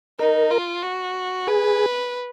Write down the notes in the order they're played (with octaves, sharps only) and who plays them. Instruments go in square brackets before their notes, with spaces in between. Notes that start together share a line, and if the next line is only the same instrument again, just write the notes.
[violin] D#4 [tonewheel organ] A#4
[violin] F4
F#4
[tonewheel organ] G#4 [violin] B4